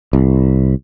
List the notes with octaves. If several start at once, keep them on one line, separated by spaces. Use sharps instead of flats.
C2